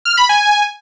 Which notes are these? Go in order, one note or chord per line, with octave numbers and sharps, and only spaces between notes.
F6
B5
G#5